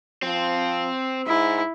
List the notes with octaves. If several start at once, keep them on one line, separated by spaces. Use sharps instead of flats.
F3 C4
G#2 E4